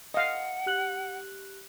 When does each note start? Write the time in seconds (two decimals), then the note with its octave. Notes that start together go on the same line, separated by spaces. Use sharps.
0.14 D#5 F5 F#5
0.66 G4 F#6 F#7